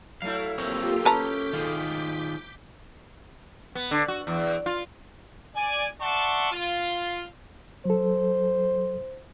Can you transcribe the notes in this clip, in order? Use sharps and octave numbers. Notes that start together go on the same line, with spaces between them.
F#3 A3 E4 F5
A#3 C4 F4 G4 A#4 C#5
C#4 B4 A5 A#5 D6 G6 B6
D#3 F4 G#4
B3
D3
F#4
E2
F4
D5 G#5
D5 E5 F#5 A5 C6 C#6
F4
F#3 A4 C5